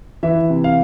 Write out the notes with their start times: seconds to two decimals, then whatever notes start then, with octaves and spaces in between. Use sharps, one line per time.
0.23 E3 E5
0.50 C3
0.64 F5